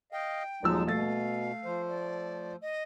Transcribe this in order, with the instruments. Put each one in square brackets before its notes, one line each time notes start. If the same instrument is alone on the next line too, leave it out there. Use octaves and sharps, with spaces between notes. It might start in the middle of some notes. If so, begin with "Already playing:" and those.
[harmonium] D#5 F5 [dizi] G5
[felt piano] D#1 F3 E6 [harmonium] F#3 G#3 D#4
[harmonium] B2 [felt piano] A3 A6 [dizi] F5
[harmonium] F3 C5
[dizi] D5
D#5